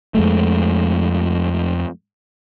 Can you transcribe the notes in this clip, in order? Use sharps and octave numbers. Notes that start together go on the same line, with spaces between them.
F2 G#3 A3